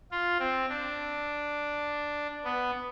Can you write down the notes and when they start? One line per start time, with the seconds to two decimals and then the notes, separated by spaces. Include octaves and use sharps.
0.11 F4
0.40 C4
0.69 D4
2.44 B3